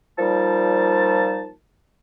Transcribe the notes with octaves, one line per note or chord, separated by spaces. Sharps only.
A#2 F3 G3 D#4 A5